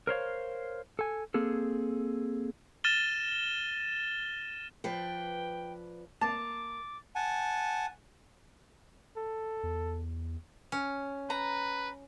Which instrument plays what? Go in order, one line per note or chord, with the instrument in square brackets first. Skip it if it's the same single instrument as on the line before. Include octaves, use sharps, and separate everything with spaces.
[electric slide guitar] A#4 C5 C#5 F5
A4 G#5
A#3 C4 G#4 A4
[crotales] F6 A6 A#6 D#7 E7 G7
[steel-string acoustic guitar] F3 B4 D5 [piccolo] G5
[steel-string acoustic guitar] A#3 [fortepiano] A5 [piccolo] D6
[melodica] F#5 G#5 A5
[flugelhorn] A4
[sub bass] E2
[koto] C#4
[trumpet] B4 [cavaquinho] A#5